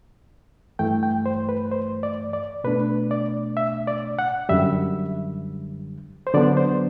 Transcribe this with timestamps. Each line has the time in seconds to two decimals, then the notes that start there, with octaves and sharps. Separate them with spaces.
0.79 G2 E3 A3 G5
1.03 G5
1.26 C5
1.49 B4
1.72 C5
2.03 D5
2.33 D5
2.64 B2 A3 D4 B4
3.11 D5
3.57 E5
3.87 D5
4.19 F#5
4.49 F#2 D3 G3 E5
6.27 C5
6.34 D3 F#3 B3 D4 D5
6.57 C5